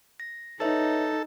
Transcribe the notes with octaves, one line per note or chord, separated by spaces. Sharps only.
A#6
D#4 A4 B4 C#5 E5